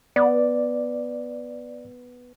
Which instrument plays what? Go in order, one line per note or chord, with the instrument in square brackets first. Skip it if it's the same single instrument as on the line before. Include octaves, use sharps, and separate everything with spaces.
[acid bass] B3 [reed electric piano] D5